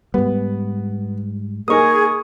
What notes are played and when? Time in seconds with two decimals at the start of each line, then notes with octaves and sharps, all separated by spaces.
0.14 G#2 G3 B3
1.68 A#3 D#4 G#4 A#4 C#6 D#6